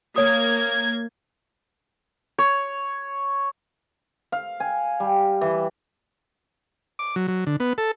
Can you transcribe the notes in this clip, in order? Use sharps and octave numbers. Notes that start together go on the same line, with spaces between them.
A#3 C#5 D#6 G#6
C#5
F5
G#5
G3
E3
D6
F#3
F#3
D3
B3
A4